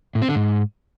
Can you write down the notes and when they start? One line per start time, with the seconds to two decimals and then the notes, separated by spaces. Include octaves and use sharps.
0.15 A2
0.22 C4
0.29 D3
0.35 G#2